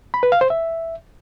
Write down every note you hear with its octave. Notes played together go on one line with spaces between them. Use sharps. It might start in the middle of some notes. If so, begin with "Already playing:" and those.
B5
B4
F5
C5
E5